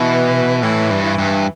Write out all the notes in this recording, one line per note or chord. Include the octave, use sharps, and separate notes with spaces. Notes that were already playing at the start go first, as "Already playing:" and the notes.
Already playing: B2 E3
A2 E3
G2
E3
G2